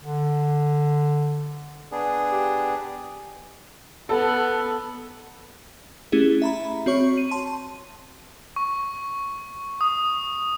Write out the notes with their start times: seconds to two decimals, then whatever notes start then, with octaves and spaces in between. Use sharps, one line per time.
0.02 D3
1.92 B3 D4 G#4
2.31 G4
4.09 B3 A4
6.12 A3 C#4 E4 G4 G#4
6.42 E5 A#5 B5
6.86 C4 F#4 C#5 C#6
7.17 D#7
7.31 A5 C6
8.56 C#6
9.81 D#6